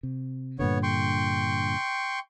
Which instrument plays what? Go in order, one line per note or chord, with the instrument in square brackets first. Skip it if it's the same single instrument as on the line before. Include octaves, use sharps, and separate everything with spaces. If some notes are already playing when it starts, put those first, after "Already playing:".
[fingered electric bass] C3
[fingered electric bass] G2 A#2 D3 [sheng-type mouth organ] B3 C#5
[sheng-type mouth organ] G5 C6 C#6